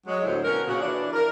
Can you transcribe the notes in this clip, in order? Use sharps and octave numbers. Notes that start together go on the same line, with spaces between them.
F#3 G#3
D2 A2 F#3 G3 E4 C5
B2 C#4 F#4 A#4
A#2 C#3 F#4
E3 D4
A#4